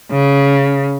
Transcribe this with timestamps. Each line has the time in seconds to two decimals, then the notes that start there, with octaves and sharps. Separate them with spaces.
0.11 C#3